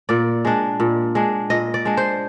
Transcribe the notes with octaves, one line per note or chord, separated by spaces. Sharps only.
A#2 D5
G#3 D4
A#2
G#3 D4
A#2 D#5
D5
G#3 D4
C5